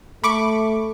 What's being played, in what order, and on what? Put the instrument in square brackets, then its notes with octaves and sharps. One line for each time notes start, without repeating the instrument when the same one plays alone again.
[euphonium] A3 [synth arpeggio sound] B5 C#6 D6